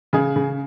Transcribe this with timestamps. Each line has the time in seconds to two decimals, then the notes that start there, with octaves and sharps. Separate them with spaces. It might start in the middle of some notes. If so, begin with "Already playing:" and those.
0.13 C#3 G#4
0.36 C#3